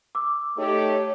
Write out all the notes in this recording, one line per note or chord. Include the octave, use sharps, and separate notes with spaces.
D6 E6
A3 D#4 G4 C#5 D6